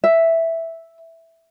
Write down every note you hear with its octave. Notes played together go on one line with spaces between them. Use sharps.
E5